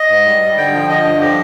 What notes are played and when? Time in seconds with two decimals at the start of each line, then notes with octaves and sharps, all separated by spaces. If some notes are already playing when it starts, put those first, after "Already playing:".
Already playing: D#5
0.09 G#2
0.25 G3
0.42 G3
0.57 D3 G5
0.73 F3
0.88 D3 D#5
1.04 G2
1.20 F3 G4